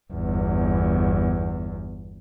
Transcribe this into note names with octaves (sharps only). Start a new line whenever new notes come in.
G1 E2